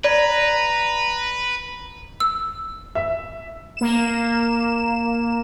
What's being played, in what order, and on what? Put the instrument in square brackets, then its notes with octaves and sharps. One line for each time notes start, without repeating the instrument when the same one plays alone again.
[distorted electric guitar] B4 [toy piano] D5 [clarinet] A#5
[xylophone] E6
[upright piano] E5
[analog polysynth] A#3 E7